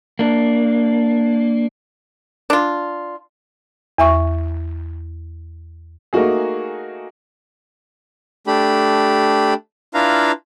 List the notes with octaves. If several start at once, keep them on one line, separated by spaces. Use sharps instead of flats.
A#3 D4
D4 F4
E2 E5 C#6
A3 A#3 D#4 F#4 G#4
A3 D4 G4 B5
D4 E4 F4 B4 F5 A#5